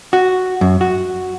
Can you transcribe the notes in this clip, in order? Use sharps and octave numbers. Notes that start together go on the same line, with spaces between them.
F#4
F#2
F#4